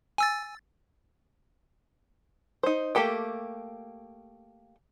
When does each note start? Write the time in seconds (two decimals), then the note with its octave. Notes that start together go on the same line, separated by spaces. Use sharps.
0.18 G#5 E6 A6
2.63 D#4 C5
2.95 A3 A#3 G4 A4 G5